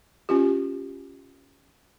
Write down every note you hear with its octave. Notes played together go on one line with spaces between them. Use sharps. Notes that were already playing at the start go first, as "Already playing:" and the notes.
C#4 F4 G4